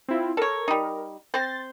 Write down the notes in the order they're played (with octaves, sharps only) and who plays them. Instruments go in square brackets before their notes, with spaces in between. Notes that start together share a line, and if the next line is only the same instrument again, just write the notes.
[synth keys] C4 E4 F4
[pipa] A4 C#5 [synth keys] A#4
[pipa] G3 D#4
[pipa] C4 C5 [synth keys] A6